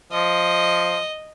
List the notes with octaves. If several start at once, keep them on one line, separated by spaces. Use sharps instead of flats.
F3 D#5